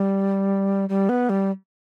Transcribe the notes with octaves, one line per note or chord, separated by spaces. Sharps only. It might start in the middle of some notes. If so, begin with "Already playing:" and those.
Already playing: G3
G3
B3
G3